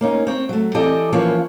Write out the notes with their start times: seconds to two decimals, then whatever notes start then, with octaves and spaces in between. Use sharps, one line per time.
0.01 A#3 C#4 D#4
0.27 C4 C#5
0.49 F#3 A3
0.74 E3 C4 G4 A4 D5 D#5
1.12 E3 F3 A#3 C#4 B4 C#5